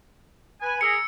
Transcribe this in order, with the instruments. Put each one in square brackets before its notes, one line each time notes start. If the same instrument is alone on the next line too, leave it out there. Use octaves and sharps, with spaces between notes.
[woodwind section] B4 G#5
[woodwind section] G#4 A#4 [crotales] E6 C#7